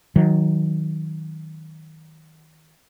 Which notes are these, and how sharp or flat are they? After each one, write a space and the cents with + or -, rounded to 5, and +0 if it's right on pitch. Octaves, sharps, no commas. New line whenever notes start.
D#3 +20 F#3 +0